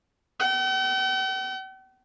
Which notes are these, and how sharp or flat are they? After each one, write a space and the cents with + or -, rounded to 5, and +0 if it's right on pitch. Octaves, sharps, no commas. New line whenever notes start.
G5 -45